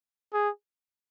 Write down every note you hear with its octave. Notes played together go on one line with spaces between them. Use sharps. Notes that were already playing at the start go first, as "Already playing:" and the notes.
G#4